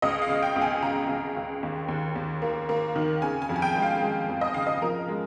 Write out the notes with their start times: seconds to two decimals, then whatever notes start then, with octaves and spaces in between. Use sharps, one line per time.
0.02 C#2 D#5
0.22 F5
0.29 C#3
0.42 G5
0.56 C#2
0.62 G#5
0.82 C#3 A#5
1.09 C#2
1.36 C#2
1.63 D#2
1.88 D#2
2.16 D#2
2.42 A#3
2.69 A#3
2.96 D#3
3.22 C#3 G#5
3.42 G#5
3.49 F2
3.56 G#5
3.62 G5
3.76 G#3
3.82 F5
4.02 G#3
4.29 F2
4.41 D#5
4.54 C#3 F5
4.67 D#5
4.82 F3 A#4
5.08 G#3